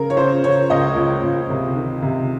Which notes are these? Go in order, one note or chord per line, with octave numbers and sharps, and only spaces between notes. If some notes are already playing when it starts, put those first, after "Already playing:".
Already playing: C#3 A#4
C#5
C#3 C5
C#3 C#5
C#2 D#5
C#2
C#2
C3
D#3
C3